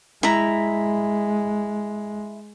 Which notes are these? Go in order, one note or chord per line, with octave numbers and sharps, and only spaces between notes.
G#3 E4 A#5